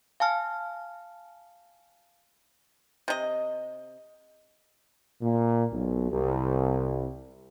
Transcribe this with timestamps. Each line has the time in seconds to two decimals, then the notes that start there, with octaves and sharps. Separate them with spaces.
0.20 F5 G#5 A5 F6
3.08 C3 D#5
5.22 A#2
5.72 B1
6.11 C2